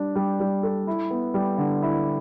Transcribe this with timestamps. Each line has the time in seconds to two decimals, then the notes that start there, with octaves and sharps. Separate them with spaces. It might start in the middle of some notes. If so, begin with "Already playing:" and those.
Already playing: G3 D4
0.16 G3
0.40 G3
0.63 A4
0.87 E4
1.10 B3
1.34 G3
1.58 D3
1.82 E4